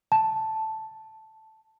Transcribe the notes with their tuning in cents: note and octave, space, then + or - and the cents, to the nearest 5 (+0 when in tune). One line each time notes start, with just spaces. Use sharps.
A5 +0